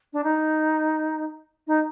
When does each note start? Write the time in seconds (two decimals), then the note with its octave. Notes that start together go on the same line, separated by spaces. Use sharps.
0.13 D4
0.24 D#4
1.67 D#4